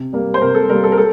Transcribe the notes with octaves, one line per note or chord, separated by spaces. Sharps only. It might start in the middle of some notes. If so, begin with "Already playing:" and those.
Already playing: C3
G3 A#3
C5
C3 A#4
A4
G3 A#3 A#4
A4
A#4
A4